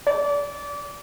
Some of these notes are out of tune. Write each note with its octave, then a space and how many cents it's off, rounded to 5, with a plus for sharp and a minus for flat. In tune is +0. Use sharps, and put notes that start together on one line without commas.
D5 -30